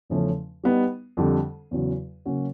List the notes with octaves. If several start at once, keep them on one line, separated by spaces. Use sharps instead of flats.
E2 C#3 F3 A3 C#4
G3 B3 D#4
F2 D3 G3
E2 C#3 F#3
C#3 F#3 A#3 C#4 F#4